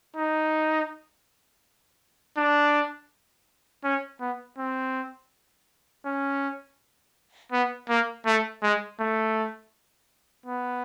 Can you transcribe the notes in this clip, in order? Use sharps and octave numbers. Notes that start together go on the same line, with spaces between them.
D#4
D4
C#4
B3
C4
C#4
B3
A#3
A3
G#3
A3
B3